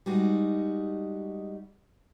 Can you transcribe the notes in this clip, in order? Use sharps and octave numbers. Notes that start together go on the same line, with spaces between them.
G3 G#3 D#4 F#4